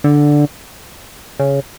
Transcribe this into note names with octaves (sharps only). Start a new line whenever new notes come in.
D3
C#3